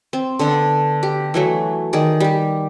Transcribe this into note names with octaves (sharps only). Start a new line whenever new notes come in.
C4
D3 B3 D4
G4
E3 F#3 A3
D#3 G#4 D5
G3 G4